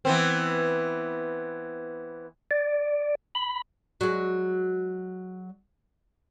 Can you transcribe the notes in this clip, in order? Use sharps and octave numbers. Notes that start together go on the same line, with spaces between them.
E3 B3 C4
D5
B5
F#3 G#3